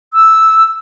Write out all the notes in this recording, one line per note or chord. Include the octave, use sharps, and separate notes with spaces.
E6